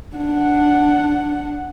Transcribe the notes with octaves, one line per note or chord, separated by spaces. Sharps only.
D4 F#5